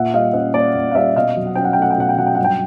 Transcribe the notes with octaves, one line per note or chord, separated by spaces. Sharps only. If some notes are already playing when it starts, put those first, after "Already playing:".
Already playing: A#2 E5 F#5
G3 D#5 F5
C#4 D#5
A#3 D5
A#2
F5
G3 D5 E5
B2 D#5 F5
F#3
F#5
C#4 G5
F#5
G5
A3 F#5
G5
B2 F#5
G5
F#3 F#5
G5
G2 F#5
G5